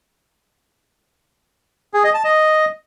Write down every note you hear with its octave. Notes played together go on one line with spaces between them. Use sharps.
G#4
D#5
A5
D#5